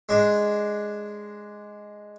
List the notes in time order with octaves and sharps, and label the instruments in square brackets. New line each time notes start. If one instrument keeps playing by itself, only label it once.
[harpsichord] G#3 D4